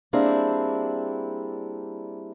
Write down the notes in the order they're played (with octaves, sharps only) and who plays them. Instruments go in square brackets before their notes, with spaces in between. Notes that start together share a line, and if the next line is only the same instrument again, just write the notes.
[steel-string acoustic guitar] G3 A#3 C4 D4 E4 G#4